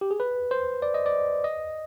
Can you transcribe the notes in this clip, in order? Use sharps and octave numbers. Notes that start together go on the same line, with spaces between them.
G4
G#4
B4
C5
D5
D#5
D5
D#5